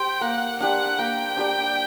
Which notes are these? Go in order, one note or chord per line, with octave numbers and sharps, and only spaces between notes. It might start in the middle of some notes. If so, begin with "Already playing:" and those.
Already playing: G4 C5 G5
A#3 F#5
D4 G4 D5 F#5
A#3 G5
D4 G4 D5